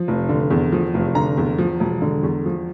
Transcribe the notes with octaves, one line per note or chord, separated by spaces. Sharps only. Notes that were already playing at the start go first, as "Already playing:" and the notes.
Already playing: F3
F1
D3
E2
F3
F1
D3 A#5
E2
F3
E1
D3
E2
F3